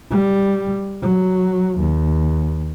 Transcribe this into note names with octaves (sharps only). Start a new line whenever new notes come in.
G3
F#3
D#2